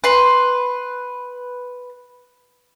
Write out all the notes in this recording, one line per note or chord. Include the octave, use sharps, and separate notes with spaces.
B4 C6